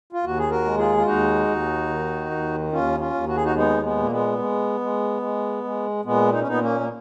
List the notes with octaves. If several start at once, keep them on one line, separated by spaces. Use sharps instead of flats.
F4
D#2 F#4
G#4
F#4 A#4
G#3
F4 G#4
F4
D#2 D#4 F#4
D#2
D#3
D#2
D#2 C#4 F4
C#4 F4
D#2
F#4
G#4
D#4 F#4
G#3 B3 D#4
G#3 B3
A#2
A#3
G#3 B3
G#3
G#3
G#3
G#3
A#2 G#3 B3
D#4
C#4
A#2 B3 D#4
A#3 C#4
A#3